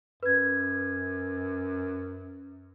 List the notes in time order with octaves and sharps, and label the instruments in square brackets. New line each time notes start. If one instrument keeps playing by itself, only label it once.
[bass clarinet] F#2 [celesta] B4 G#6